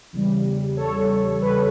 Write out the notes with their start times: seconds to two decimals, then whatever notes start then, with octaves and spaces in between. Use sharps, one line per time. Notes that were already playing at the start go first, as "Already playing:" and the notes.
0.13 E2 C#3 G3
0.77 A4 C#5
1.42 B4